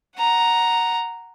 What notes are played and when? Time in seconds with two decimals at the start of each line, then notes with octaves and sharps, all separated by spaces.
0.17 F#5 A#5